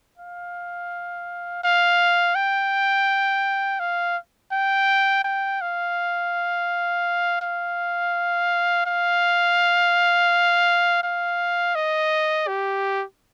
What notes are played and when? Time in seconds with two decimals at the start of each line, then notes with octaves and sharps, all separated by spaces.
0.18 F5
1.63 F5
2.35 G5
3.79 F5
4.52 G5
5.24 G5
5.61 F5
7.41 F5
8.86 F5
11.03 F5
11.75 D#5
12.48 G4